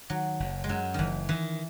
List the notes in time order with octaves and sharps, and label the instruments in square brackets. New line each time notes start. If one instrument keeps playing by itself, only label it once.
[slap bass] D#3 [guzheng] F#3
[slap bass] F#1
[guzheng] G#3
[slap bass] F#2 [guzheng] F#3
[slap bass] F#1 [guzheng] D#3 E3
[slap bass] D#3 [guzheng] E3